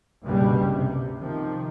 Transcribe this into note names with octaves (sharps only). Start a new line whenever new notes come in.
F#1 C2 G2 B2 G3
C3
C3 D#3 F3